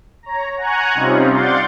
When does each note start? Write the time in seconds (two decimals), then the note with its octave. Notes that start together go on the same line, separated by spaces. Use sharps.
0.23 C#5 A#5
0.57 F#5 G#5 A#5 C#6 F#6 G#6
0.94 C3 G3 C4 C#4 D#4 F4
1.29 D5 F5 F#5 C6 G6 A6